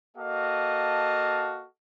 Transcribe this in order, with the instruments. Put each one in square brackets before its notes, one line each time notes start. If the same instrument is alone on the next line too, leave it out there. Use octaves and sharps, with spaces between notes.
[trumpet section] A#3 F#4 A4 D#5 F5 A5